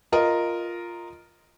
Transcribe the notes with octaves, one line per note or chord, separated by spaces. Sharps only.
F4 A#4 D#5